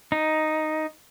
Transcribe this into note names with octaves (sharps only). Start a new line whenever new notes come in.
D#4